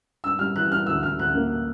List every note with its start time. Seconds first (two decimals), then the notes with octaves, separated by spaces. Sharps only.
0.24 G2 E6
0.39 G3 F6
0.56 E3 F#6
0.71 G2 F6
0.86 D2 E6
1.03 D2 F6
1.19 D2 F#6
1.34 A#3